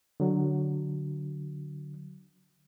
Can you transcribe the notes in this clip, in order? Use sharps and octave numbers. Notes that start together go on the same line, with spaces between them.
D3 F#3